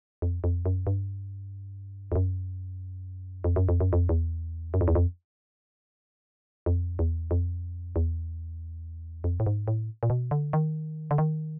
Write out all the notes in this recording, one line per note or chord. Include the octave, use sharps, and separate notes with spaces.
F2
F2
F#2
G2
F2
F#2
F2
F#2
F2
F#2
F2
E2
F#2
F2
E2
F2
F2
E2
F2
E2
F2
A2
G#2
A2
A#2
B2
D3
D#3
D3
D#3